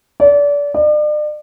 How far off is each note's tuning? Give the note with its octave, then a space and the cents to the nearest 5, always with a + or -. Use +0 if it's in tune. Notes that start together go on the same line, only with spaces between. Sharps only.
D5 -30
D5 +40